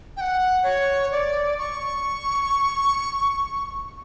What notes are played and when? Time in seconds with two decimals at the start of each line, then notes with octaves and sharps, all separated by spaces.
0.17 G5
0.21 F#5
0.63 C#5
1.12 D5
1.59 C#6